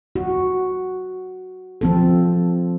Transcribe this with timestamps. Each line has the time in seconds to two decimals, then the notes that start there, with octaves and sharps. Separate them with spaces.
0.16 F#4
1.81 F3 C4 A4